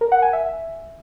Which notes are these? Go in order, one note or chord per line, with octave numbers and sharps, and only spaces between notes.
A#4
F#5
G#5
E5